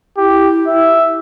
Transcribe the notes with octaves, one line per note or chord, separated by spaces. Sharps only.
E4 G4
E5